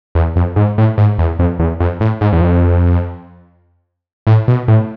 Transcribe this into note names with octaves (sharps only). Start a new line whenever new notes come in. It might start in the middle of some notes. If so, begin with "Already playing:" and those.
E2
F2
G#2
A2
G#2
E2
F2
E2
F2
A2
G#2
E2
F2
A2
B2
A2